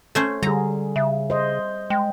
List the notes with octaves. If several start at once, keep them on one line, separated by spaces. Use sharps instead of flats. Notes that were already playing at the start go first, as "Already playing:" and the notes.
A3 C#4 C5
D3 G3 G#4 A#5
C#3 E5
C5 D#5
G#3 G5